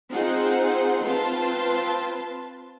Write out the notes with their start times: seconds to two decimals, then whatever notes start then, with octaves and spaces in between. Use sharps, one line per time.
0.12 C4 D#4 F4 G#4 C5 F#5
1.05 C4 F4 B4 A5 C6